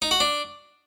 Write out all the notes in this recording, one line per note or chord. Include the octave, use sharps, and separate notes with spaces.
D#4
F#4
D4